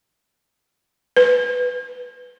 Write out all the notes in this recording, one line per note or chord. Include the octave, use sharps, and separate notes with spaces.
B4